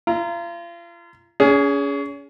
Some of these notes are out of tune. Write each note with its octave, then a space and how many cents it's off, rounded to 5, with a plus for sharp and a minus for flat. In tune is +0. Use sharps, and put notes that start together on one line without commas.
F4 -35 A#5 +0
C#4 +35 G#4 +0